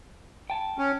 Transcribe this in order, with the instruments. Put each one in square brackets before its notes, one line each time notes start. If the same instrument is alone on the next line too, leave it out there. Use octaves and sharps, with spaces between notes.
[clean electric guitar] G5 A5
[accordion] C#4